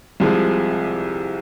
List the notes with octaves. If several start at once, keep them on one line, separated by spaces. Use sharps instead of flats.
C2 C3 F3 G#3